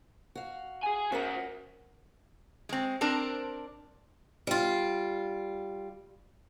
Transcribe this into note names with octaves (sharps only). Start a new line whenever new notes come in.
F#4 F5
G#4 G#5
C#4 F#4 A#4 C5 F#5
G#3 C4
C4 D4 A#4 C5
G3 F4